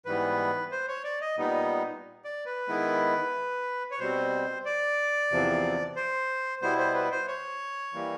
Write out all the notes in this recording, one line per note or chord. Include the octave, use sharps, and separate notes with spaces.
G#2 E3 G3 B3 B4
C5
C#5
D5
D#5
A#2 G3 B3 D#4
D5
B4
D#3 G#3 B3 E4
C#5
B2 G3 C4 C5
D5
E2 C3 F3
C5
B2 G3 B3 E4 C5
C5
B4
C5
C#5
E3 G3 A#3